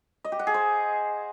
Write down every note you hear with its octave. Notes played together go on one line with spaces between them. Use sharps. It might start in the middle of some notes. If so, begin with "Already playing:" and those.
D#5
G4
F#5
G#4
C5